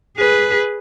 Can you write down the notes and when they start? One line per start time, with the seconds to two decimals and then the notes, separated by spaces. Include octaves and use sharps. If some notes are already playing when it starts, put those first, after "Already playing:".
0.17 G#4 B4